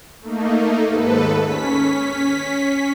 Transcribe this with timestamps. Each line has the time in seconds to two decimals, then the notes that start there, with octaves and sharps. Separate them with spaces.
0.22 A3 A#3 D#4
0.86 D#2 G#2 A4 B4
1.41 C#4 B6